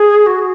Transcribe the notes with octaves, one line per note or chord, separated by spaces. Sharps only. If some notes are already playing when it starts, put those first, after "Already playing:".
Already playing: G#4
F#4